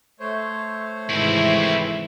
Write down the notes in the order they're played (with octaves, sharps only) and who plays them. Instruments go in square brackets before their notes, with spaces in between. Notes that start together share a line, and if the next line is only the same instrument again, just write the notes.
[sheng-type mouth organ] A3 C5 C#5
[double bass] G#1 C3 [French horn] E3 [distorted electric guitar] C4 E4